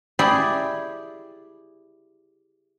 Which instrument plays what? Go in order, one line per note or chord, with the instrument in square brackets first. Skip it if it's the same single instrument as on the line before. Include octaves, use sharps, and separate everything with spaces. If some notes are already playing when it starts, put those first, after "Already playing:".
[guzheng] E4 G4 G#4 D5